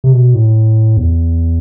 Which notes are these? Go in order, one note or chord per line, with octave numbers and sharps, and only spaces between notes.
C3
B2
A2
E2